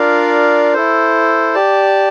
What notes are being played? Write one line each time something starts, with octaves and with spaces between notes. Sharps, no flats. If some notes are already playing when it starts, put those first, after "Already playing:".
Already playing: D4 F4 A#4 D5 F5
E4 A4 C5
G4 D5 A5